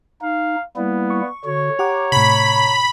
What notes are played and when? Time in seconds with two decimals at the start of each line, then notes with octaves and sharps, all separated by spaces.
0.22 D#4 F5
0.77 G3 A#3 B3 E4
1.10 C#6
1.45 D3 F#4 C#5
1.79 G4 F#5 A#5 D6
2.12 A2 C3 B5